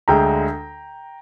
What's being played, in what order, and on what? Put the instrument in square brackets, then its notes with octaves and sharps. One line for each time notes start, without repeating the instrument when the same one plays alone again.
[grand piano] D2 D3 G#3 G5 A#5